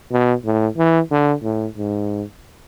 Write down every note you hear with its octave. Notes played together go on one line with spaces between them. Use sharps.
B2
A2
E3
D3
A2
G#2